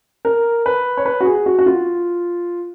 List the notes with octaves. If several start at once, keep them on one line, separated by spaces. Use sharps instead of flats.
A#4
B4
C#5
B4
F#4
G#4
F#4
F#4
F4